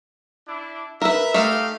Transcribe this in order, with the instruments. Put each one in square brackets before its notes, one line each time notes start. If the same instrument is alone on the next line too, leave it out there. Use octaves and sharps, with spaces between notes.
[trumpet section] D4 E4
[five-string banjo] A#4 B4 [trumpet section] E5
[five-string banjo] A3 E5 [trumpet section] D#4 G4 F5